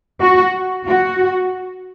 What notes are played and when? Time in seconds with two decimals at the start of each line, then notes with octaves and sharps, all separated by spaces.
0.21 F#4
0.87 F#4